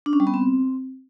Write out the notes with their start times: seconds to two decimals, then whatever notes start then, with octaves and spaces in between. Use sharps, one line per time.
0.06 D4
0.13 C#4
0.20 G3
0.27 B3
0.34 C4